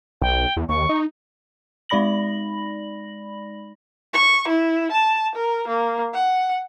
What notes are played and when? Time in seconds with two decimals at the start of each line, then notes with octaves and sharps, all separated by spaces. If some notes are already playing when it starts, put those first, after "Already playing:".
0.22 B1 G5
0.57 E2
0.69 D#2 C#6
0.89 D#4
1.89 G#3 D#4 D5 B5 A#6 F#7
4.14 C#6
4.48 E4
4.92 A5
5.35 A#4
5.68 A#3
6.14 F#5